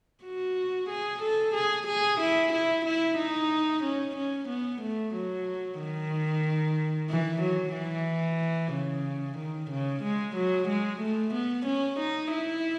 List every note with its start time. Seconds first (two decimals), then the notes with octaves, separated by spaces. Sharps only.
0.24 F#4
0.90 G#4
1.22 A4
1.55 G#4
1.87 G#4
2.20 E4
2.53 E4
2.85 E4
3.18 D#4
3.83 C#4
4.15 C#4
4.48 B3
4.81 A3
5.14 F#3
5.79 D#3
7.09 E3
7.42 F#3
7.74 E3
8.73 C#3
9.38 D#3
9.70 C#3
10.03 G#3
10.36 F#3
10.68 G#3
11.01 A3
11.34 B3
11.66 C#4
11.99 D#4
12.32 E4